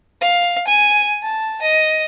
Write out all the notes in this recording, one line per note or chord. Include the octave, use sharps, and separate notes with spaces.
F5
G#5
A5
D#5